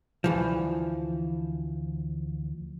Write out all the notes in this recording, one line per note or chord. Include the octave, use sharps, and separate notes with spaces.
D2 E3 F3